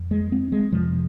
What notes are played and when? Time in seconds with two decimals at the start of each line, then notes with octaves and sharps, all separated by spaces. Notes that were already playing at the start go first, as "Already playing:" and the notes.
Already playing: F2
0.11 G#3
0.32 C4
0.52 G#3
0.72 F2 C3 F3